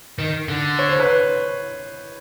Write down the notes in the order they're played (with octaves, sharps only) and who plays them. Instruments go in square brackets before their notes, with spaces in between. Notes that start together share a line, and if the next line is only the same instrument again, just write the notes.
[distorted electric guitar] D#3
D3
[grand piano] C#5
C5
B4 C#5